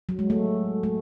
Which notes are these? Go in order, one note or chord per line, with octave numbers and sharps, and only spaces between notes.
F#3
G#3
A3
A3